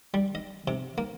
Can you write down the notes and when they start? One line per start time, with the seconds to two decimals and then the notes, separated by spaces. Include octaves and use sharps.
0.14 G3
0.35 D#5
0.68 C3
0.98 A#3